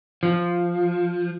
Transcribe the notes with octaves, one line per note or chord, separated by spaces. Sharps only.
F3